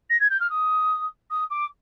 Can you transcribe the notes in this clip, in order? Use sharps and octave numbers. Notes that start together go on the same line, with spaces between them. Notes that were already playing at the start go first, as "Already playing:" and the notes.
A#6
G#6
G6
F6
D#6
D#6
D6